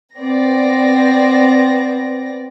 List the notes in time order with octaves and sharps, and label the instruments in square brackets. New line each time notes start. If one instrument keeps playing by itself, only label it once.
[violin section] B3 C4 D5 A#6